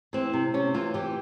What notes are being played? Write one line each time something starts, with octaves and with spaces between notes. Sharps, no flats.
E3 C4
C3
C3 C#4
E3 F4
E3 G4